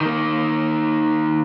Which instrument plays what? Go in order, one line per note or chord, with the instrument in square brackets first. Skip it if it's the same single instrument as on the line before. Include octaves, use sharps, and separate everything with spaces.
[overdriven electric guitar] D#3 A#3